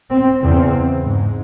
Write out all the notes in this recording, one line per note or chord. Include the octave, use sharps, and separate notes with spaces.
C4
E2 C#3 C4
G#2